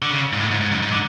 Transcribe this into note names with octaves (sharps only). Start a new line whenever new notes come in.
D3
C#3
G#2
A2
G#2
G#2
F#2
G#2
D3